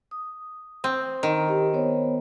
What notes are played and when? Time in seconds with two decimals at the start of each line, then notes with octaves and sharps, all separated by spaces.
0.11 D#6
0.84 C4
1.23 D#3
1.48 G4
1.73 B3 C5 C#5